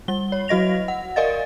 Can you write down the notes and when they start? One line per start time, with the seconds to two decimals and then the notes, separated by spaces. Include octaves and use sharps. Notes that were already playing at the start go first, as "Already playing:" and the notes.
0.08 G3 G7
0.32 C#5
0.48 F#3 F#4 D#5 A#6 F7
0.88 F#5
1.16 A#4 D5 D#5 F5 A6